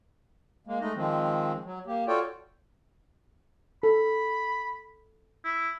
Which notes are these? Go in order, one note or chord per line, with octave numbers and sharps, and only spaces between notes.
G#3 A#3
G#3 A3 D#4 D#5
D#3 F3 G#3 C4
F#3
A#3 G4
F4 F#4 A4 C#5 D5 G5
A4 B5
E4